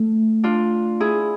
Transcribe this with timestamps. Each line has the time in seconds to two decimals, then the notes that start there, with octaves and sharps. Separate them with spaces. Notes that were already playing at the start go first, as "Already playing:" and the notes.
Already playing: A3
0.43 D4 F4
1.00 E4 G#4